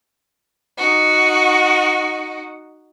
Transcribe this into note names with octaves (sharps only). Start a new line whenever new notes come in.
D#4 F#4